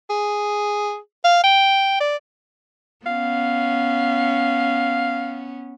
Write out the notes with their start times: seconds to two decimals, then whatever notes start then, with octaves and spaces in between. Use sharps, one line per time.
0.10 G#4
1.24 F5
1.44 G5
2.00 D5
3.06 B3 C#4 F5